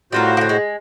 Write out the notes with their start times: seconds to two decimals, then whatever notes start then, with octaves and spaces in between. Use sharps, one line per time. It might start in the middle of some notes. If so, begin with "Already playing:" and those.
0.12 A2 G3 F4 F#4 A#4 C5
0.37 D3 A#3
0.49 G#3